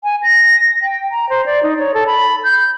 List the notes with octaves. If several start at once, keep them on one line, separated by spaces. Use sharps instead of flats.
G#5
A#6
G5
A#5
C5
D5
D#4
C#5
A4
B5
G6